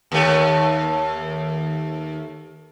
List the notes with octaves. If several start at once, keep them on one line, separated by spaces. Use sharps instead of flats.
D#2 A3